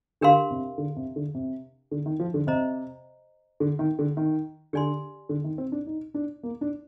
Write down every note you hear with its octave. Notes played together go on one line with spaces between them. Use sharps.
D3 D4 G4 A#4 F5 C6
C3
D3
C3
D3
C3
D3
D#3
F3
D3
C3 C5 D#5 A#5
D3
D#3
D3
D#3
D3 G4 D5 G#5 C6
D3
D#3
C4
D4
D#4
D4
A#3
D4